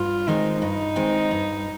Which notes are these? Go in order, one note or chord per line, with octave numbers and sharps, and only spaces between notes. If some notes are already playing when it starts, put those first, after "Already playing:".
Already playing: G2 F4
D#3 G#3 C4 D#4
G2 D#4
D#3 G#3 C4
G2